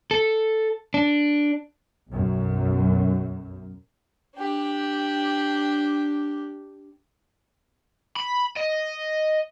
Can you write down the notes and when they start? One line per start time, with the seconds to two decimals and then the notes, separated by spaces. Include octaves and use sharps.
0.11 A4
0.94 D4
2.12 B1 F#2
4.36 D4 G4
8.16 B5
8.57 D#5